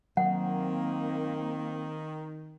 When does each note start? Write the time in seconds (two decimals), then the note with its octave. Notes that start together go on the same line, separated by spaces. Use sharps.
0.17 D#3 F#3 A#3 C4 F#5